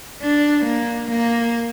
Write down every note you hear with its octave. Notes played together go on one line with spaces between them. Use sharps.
D4
A#3
A#3